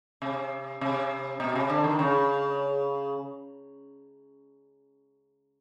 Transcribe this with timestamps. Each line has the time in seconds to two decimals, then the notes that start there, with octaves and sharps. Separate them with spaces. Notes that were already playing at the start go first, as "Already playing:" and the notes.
0.22 C3
0.81 C3
1.40 B2
1.56 C3
1.70 D3
1.84 D#3
1.99 C#3